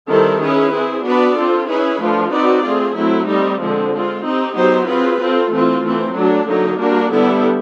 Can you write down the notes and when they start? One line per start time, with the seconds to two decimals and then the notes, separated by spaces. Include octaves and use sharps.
0.09 D#3 G3 C4 E4 A4
0.40 C#4 E4 G#4 B4
0.72 C4 E4 G#4
1.05 B3 D4 F#4 B4 D5
1.36 C4 F4 A4
1.69 C#4 E4 G#4 B4
2.00 F3 A3 D4 F4
2.32 C4 D#4 F#4 B4 D5
2.65 A3 C4 F4 G#4
2.96 F#3 A3 C4 E4
3.28 G3 C4 D#4
3.60 D3 F3 G#3 C4
3.92 G#3 C4 F4
4.24 C4 D#4 G4
4.56 F#3 B3 D#4 G4 C5
4.88 C4 F4 G#4 B4
5.21 C4 F4 A4
5.52 E3 A3 C4 F4
5.85 E3 A3 C4
6.16 F#3 A3 D4
6.48 D3 F#3 A#3 D#4
6.80 G3 A#3 D4 F#4 A#4
7.11 D3 G3 B3 E4 A4